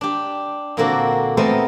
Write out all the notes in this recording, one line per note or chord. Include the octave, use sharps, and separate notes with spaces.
D4 G4
A#2 D3 A#3 C4 F#4 A4
A3 B3 C4 A#4 C5 D#5